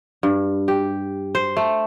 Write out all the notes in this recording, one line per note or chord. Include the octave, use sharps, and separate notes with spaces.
G2
G4
C5
A3